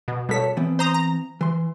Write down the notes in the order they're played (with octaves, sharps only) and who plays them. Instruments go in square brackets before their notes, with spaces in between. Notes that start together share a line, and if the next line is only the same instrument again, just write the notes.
[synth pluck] B2
[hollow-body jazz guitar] G2 A4 C#5 [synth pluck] B2 B6
[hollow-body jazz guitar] E3 B3 C4
[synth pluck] C5 A#5 D#6
A#5
[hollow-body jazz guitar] E3 C6